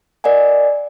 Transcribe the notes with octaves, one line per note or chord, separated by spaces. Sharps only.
A#4 D5 D#5 F#5 G#5